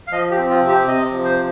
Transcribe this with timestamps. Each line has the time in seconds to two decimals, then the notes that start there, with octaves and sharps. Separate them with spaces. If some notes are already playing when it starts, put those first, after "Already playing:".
0.07 F5
0.12 F3 D#5
0.31 G4
0.37 C4
0.50 F4
0.62 C3
0.68 G4
0.88 C3 D#5
1.12 F3
1.25 C5